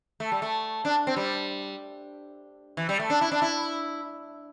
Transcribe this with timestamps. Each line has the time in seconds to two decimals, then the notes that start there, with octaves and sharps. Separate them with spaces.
0.20 A3
0.32 G3
0.42 A3
0.85 D4
1.07 C4
1.16 G3
2.77 E3
2.89 G3
2.99 A3
3.10 D4
3.21 E4
3.32 D4
3.42 E4